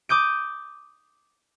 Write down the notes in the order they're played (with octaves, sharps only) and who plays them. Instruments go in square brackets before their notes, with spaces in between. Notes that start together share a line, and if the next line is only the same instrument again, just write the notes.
[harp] D6 D#6 G6 D7